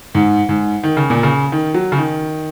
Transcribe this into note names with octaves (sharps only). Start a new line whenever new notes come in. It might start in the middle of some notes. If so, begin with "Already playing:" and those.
G#2
G#2
D#3
C#3
A#2
C#3
D#3
F#3
C#3
D#3